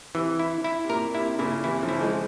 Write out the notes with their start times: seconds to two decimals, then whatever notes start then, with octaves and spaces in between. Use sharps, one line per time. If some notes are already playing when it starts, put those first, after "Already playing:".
0.15 C3 E3
0.39 E4
0.64 E4
0.84 C3
0.89 A#2 A#4
1.14 C3 E4
1.39 A#2 C#3 E4
1.64 C3 E3 E4
1.83 C#3 F3
1.89 E4
2.01 F3 G#3